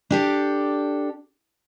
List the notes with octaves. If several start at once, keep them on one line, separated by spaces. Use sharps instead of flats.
D4 G4 A4